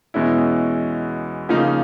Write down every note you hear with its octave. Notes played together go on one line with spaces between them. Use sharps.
E2 B2 G#3 C#4 E4
C#3 F3 A#3 D#4